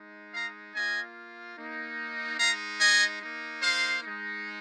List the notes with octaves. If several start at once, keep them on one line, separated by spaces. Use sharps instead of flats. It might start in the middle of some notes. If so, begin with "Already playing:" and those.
Already playing: G#3 D#4
F5 A#5
A#3 F4 D#5 G#5
A#3 D#4
G#3 D#4 F5 A#5
D#5 G#5
A#3 D#4
C5 F5
G#3 D#4